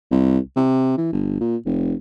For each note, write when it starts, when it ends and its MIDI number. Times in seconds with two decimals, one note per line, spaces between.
0.11 0.38 36
0.56 0.97 48
0.98 1.11 52
1.13 1.37 31
1.40 1.56 46
1.65 1.94 29